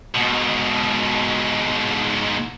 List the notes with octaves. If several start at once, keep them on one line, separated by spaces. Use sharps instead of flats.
G#2 B2